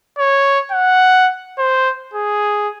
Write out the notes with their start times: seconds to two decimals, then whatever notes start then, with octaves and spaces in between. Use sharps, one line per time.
0.18 C#5
0.71 F#5
1.58 C5
2.13 G#4